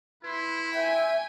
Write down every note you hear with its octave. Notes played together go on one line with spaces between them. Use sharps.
E4 B4 C6
E5 G5 G#5